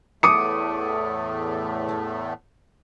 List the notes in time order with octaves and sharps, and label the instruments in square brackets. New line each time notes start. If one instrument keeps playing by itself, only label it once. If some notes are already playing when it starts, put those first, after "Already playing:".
[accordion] E2 A2 A3 [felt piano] D6 D#6 C#7